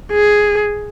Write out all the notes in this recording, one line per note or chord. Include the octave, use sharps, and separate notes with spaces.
G#4